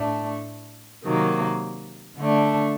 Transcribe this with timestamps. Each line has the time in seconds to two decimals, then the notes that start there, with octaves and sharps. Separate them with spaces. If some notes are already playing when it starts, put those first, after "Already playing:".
Already playing: A2 A3 D4
1.03 C3 D#3 F#3 A#3
2.18 D3 A3 D4